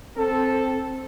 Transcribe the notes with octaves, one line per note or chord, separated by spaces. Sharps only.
C4 A4